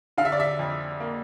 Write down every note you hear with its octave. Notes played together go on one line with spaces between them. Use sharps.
D3 F5
E5
D5
E5
F2
A#3